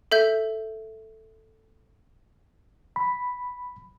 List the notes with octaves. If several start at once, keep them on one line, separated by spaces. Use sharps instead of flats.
A4 E5 G6
B5